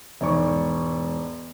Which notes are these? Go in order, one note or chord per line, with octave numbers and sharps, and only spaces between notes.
E1 G#2 D5 C#6